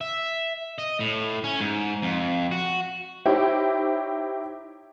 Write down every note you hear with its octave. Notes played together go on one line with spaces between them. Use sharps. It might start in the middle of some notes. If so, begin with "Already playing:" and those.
E5
D#5
A2
C#4
G#2
F2
F#4
D#4 E4 G4 C5 C#5